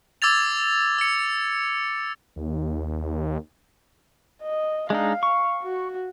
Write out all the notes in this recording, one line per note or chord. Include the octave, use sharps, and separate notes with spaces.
D6 E6 G#6 A6 F7
E6 C#7
D#2
D#5
G#3 D4 D#4 F5
C#6
F#4